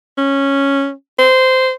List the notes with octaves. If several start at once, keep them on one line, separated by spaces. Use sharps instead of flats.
C#4
C5